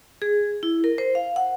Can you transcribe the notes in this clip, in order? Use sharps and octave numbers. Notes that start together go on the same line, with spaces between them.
G#4
E4
A#4
C5
F5
F#5